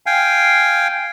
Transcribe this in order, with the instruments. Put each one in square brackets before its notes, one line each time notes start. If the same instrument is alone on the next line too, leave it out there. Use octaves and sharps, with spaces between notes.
[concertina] F5 G5 G#5